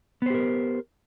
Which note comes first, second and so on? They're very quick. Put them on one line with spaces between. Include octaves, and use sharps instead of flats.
B3 C5 G4 A#4